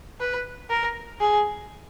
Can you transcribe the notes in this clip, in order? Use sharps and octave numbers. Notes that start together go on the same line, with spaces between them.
B4
A#4
G#4